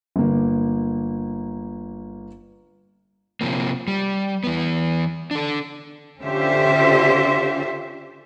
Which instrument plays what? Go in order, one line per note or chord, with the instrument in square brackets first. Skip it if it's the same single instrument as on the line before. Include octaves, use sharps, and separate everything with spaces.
[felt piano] G1 A#3
[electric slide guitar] C3 F3 A#3
G3
E3 B3
D4 A4
[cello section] D3 C#4 F4 G4 C5 E5